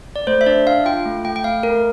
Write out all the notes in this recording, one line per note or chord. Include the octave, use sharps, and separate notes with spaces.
D5
A3 C5
E5
D4 D5
D4 F5
F4 G5
A3
A3 G5
G5
A3 F5
A3 A#4